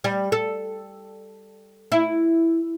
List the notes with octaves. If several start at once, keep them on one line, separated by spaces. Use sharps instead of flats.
G3
A4
E4